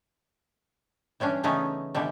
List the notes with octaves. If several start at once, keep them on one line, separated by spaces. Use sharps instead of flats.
E3 G3 C#4 D4
C#3 E3 A3 B3 C#4 D#4
B2 D3 E3 G3